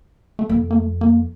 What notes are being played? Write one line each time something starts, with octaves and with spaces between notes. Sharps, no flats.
A3
F2 A#3
A#3
A3
A#3